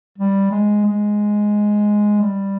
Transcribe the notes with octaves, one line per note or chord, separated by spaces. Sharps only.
G3
G#3
G#3
G3